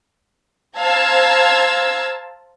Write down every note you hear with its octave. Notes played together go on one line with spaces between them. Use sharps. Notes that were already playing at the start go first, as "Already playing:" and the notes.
C5 F5 A5 A#5 E6 G#6